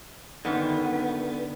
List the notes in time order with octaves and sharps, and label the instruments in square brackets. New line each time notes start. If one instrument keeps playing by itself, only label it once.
[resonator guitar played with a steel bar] F#2 D#3 [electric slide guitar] D3 B3